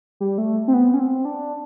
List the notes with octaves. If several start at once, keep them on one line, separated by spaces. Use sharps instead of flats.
G3
A3
C4
B3
C#4
C4
D4